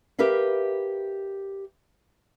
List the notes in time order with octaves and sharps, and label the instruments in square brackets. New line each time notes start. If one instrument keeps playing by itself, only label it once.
[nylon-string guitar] G4 A#4 B4 E5 F5